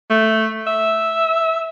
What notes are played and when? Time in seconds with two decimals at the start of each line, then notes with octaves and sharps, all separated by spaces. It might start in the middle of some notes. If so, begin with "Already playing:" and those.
0.10 A3
0.67 E5